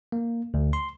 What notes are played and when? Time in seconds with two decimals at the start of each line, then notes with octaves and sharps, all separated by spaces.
0.12 A#3
0.54 D2
0.73 C6